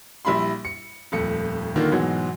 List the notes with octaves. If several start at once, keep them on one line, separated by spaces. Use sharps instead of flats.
A#1 G3 E4 B5 C6
C#7
D#1 F2 A3 C#7
D3 D#3 A#3 F4
G#2 B2 E3 F#3